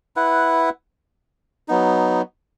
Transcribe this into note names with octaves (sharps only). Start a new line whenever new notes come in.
E4 B4 F#5
F#3 B3 D#4